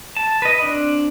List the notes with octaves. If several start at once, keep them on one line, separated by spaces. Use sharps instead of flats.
A5
B4 D#5
C4 D4